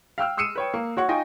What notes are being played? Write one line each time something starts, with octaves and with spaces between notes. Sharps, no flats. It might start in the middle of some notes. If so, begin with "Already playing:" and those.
F5 G5 E6 F6
D#6 E6 C7 C#7 D#7 E7
B4 C#5 G5
A#3
F#4 C#5 F#5 C#6
D#4 F4 D#5 G5 G#5 C#6